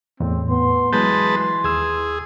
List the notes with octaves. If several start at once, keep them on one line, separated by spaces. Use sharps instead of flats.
E2 A2 C4
B3 C6
E3 F#3 G#3 B4 A5 G6
D#2 G#4 E6